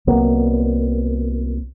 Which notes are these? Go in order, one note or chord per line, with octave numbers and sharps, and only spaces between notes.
C2 F#3 A#3 B3